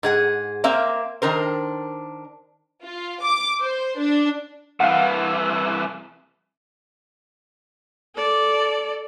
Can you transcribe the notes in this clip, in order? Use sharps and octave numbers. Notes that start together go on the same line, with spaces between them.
G#2 G#4 F#5
A#3 C4 E5 F5
D#3 D4 A#4 C5
F4
D6
C5
D4
C2 E3 F5 F#5
A4 D5